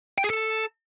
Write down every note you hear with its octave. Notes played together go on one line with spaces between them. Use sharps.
G5
G#4
A4